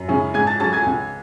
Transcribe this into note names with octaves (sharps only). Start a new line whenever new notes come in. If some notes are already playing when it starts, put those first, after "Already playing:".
Already playing: F#2
C#3 G#3 C#4 E4
G#2 G#5 G#6
A5 A6
F#3 C#4 A5 A6
G#5 G#6
C#2